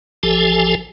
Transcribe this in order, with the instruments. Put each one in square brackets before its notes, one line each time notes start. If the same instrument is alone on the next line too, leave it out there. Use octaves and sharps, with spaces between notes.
[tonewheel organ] A1 F3 G4 A4 G#5